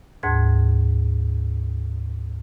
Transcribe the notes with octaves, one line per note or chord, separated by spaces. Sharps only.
D2 G#2 A5 G#6